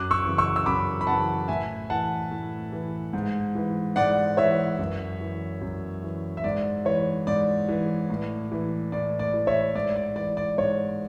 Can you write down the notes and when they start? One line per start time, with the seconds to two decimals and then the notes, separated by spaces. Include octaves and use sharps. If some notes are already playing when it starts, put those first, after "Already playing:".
Already playing: F#2 D6 F#6
0.11 C#6 E6
0.24 C#3 E3
0.38 C#6 E6
0.56 E6
0.66 F#2 B5 D6
1.01 B5
1.07 C#3 E3 F#5 A5
1.48 A2 E5 G#5
1.90 E3 F#5 A5
2.31 A2
2.72 E3
3.13 G#2
3.55 E3
3.96 G#2 D5 F#5
4.37 E3 C#5 E5
4.79 F#2
5.21 E3
5.61 F#2
6.02 E3
6.37 E5
6.44 G#2 D5
6.85 E3 C#5
7.27 G#2 D5
7.69 E3
8.10 A2
8.52 E3
8.92 A2 D5
9.19 D5
9.34 E3
9.47 C#5 E5
9.75 G#2 D5
9.96 D5
10.16 E3 D5
10.37 D5
10.58 G#2 C#5